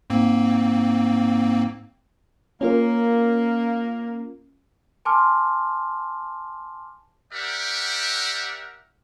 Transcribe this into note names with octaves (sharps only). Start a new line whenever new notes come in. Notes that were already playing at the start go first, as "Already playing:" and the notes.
G#2 A#3 C4
A#3 C#4 F4 A#4
G#5 A5 C6 D6 F6
G4 A#4 D5 E5 F#5 G5